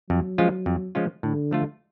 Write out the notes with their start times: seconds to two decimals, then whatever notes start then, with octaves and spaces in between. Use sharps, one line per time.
0.10 F2 F#3
0.38 F3 G#3 C#4 F4
0.66 F2
0.95 F3 G#3 C#4 F4
1.23 A2 D3
1.51 F3 A3 F4